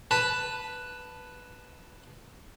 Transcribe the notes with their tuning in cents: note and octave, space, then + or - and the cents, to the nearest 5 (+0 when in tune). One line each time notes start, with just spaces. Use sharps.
B4 +0 A5 +5